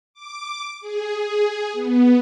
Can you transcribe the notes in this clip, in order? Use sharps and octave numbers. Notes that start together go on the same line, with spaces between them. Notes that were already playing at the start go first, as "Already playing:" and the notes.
D6
G#4
G#4
B3